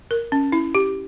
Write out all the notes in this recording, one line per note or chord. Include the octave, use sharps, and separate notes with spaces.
A#4
C#4
E4
G4